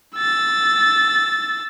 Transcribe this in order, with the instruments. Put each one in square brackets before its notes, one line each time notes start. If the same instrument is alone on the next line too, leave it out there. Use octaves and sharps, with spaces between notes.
[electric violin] E6 A6